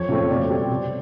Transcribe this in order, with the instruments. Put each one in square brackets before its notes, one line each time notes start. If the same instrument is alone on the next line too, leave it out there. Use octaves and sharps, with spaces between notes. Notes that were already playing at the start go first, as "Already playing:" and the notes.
Already playing: [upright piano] F2 C#5
C#3 F3 A3 C4
B2 D5
G3 C4
C3